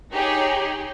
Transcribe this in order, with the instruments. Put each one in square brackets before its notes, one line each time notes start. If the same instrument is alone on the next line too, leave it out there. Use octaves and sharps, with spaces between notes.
[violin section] D#4 G4 G#4 C#5